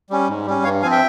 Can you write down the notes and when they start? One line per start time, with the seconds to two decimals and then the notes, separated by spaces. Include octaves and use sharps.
0.10 G3 C#4
0.28 G#2
0.46 G3 C#4
0.64 G2 C#5 F5
0.82 F3 C4 F5 G#5
0.91 E5 G5